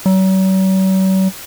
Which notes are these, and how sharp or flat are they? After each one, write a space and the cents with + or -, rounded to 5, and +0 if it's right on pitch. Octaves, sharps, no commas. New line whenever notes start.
F#3 +45